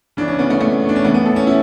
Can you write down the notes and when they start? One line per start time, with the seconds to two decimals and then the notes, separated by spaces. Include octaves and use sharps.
0.17 C#3 E3 D4
0.28 C#4
0.39 B3
0.50 A3
0.61 A3
0.89 D4
0.96 C#4
1.04 A2 E3 B3
1.14 B3
1.25 A4
1.36 C#4
1.47 E4